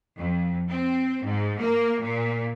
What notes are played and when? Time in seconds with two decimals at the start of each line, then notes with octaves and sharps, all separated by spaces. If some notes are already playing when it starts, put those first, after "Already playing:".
0.17 F2
0.69 C4
1.24 G#2
1.60 A#3
2.01 A#2